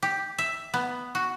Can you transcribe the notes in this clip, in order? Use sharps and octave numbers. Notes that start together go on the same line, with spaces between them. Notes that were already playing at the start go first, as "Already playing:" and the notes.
G4
E5
B3
F#4